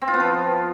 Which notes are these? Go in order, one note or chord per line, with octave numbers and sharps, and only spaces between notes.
C4
F4
B3
F3